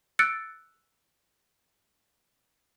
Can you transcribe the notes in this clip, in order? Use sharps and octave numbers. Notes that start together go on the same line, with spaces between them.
E6 F#6 A6 C#7 D7